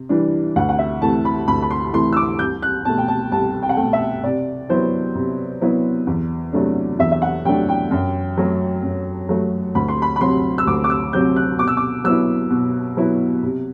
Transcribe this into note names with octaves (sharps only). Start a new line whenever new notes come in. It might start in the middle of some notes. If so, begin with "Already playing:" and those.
Already playing: C3
E3 G3 D4
D2 F#5
F#5
E5
C3 E3 A3 A5
B5
D2 B5
B5
C6
C3 E3 A3 C6
E6
D6
C2 G6
F#6
B2 A3 A5
G5
A5
C2 A5
G5
F#5
B2 A3 G5
E5
C3 D5
F#3 B3 E4 C5
C3
F#3 B3 E4
E2
C3 F#3 A3 D4
E2 E5
E5
F#5
C3 F#3 A3 D4 G5
G5
F#2
F#3 A3
F#2
F#3 A3
D2 B5
C6
B5
B5
C3 F#3 C4 C6
E6
D2 D6
D6
E6
C3 F#3 C4 G6
F#6
B2 D6
E6
D6
F#3 B3 E4 E6
B2
F#3 B3 E4
C3